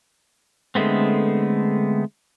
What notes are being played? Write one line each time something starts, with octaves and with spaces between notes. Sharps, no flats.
D3 G#3 A3 B3 C4